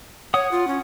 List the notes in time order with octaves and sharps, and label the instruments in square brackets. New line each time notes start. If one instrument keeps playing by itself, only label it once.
[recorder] C#5 [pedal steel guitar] F#5 D#6
[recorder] F4
C#4